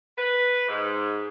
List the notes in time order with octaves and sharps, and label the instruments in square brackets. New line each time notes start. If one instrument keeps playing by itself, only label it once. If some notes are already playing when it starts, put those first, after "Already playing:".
[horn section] B4
G#2